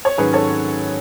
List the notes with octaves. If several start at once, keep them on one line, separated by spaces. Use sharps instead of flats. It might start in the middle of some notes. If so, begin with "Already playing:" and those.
C#5
G#2 D#3 F#3 C#4 G#4 B4
A4 C#5